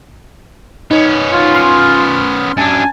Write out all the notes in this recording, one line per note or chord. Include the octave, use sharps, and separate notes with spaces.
B3 C#4 D#4
F4
C6 F6
F#2 D4 G#5 A5